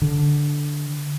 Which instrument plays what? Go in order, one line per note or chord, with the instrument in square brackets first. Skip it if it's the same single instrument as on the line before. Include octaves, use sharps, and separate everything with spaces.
[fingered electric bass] D3